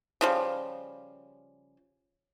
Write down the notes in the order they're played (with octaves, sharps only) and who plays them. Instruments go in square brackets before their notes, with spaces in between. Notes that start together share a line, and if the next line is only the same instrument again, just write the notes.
[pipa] C#3 F3 G3